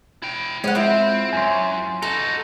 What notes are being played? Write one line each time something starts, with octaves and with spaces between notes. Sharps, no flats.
E4 G5
F3 G#3 C#4 F#5
C4 E4 F4
F#2 G#5 C6
D#4 F#4 A4